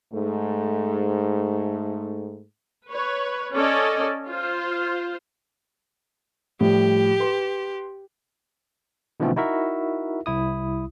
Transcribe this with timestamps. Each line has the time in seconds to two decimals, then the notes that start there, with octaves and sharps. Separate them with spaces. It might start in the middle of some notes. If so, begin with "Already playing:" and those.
0.13 G#2 A3
2.88 B4 C#5
3.54 C#4 A4 D5 D#5
4.30 F4 C5
6.61 A2 F3 G3 G4
7.20 B4 C6
9.20 B2 D3 E3 F3 A3 C4
9.36 D#4 E4 F#4 A#4 E5
10.26 C2 E4 D#6